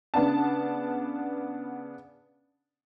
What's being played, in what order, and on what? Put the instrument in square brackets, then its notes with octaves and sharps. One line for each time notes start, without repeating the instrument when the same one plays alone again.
[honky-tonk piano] C#3 B3 D4 A5